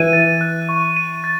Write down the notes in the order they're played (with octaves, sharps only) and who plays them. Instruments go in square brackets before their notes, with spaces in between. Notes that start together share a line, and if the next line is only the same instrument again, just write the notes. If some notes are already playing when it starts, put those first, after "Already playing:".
Already playing: [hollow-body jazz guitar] E3 [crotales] D#7
[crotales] A6
F#6
C#6
D#7
A6